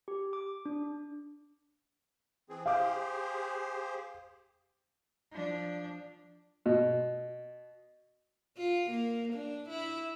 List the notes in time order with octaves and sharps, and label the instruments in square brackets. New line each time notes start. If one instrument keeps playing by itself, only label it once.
[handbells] G4
D6
D4
[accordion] E3 C4 G#4
[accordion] G4 G#4 C5 [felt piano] F5 D6
[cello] F3 D4
[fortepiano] B2
[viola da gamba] F4
A#3
D4
E4